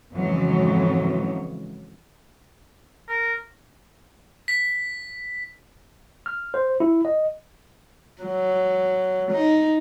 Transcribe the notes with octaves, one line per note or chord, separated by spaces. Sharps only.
F2 G#2 C#3 E3 F#3
A#4
B6
F6
C5
E4
D#5
F#3
D#4